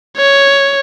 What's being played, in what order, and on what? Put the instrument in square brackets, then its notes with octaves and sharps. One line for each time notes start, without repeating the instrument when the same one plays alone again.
[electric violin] C#5